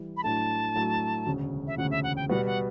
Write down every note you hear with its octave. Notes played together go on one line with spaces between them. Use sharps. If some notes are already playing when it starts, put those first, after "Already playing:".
Already playing: E3 G3
B5
A2 F#3 A3 D4 A5
A2 F#3 A3 D4
E1 D2 C#3
E5
E1 D2 C#3 F#5
E5
F#5
G5
B2 G3 B3 F#4 F#5
F#5